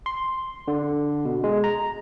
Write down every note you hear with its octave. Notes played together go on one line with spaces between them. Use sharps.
C6
D3
B2
G#3
A#5